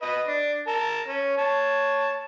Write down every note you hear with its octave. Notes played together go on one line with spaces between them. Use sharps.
B4 D#5
D4
A#4 A5
C#4
C#5 A5